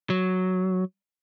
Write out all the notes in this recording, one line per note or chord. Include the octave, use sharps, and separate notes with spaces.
F#3